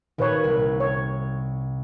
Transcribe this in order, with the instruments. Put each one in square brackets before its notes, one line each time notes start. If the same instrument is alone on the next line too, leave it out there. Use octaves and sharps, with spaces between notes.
[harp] A#2 [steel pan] D#3 B4 C#5
[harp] C2
[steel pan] C#5